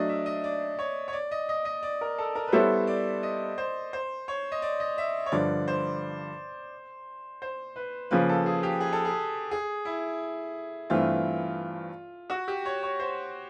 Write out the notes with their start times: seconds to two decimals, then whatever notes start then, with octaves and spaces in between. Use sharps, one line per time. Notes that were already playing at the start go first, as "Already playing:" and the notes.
Already playing: F#3 A3 D4 D5 D#5
0.09 E5
0.26 D#5
0.44 D5
0.79 C#5
1.08 C#5
1.13 D5
1.31 D#5
1.49 D#5
1.65 D#5
1.83 D5
2.01 A#4
2.18 A4
2.35 A#4
2.48 B4
2.52 G3 B3 E4 A4 C5 C#5
2.87 D5
3.23 D#5
3.58 C5
3.93 C5
4.28 C#5
4.52 D#5
4.62 D5
4.80 D#5
4.98 E5
5.26 C#5
5.32 G2 D3 F3 D5
5.68 C5
7.42 C5
7.76 B4
8.11 C#3 F3 A#3 B4
8.29 A4
8.46 G#4
8.63 G4
8.80 G#4
8.93 A4
9.05 G#4
9.51 G#4
9.85 E4
10.90 G2 E3 A3 C4 F4
12.30 F#4
12.48 G4
12.65 C#5
12.83 C#5
13.00 C5